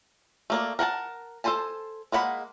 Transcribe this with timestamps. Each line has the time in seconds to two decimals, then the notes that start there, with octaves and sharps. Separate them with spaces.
0.50 A3 A#3 D5
0.79 A#4 F#5 G5 A5
1.44 A4 B4 C5 G#5 A5
2.12 G#3 A#3 F#5 B5